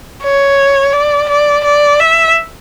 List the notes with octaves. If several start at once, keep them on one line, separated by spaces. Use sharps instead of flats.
C#5
D5
D5
D5
E5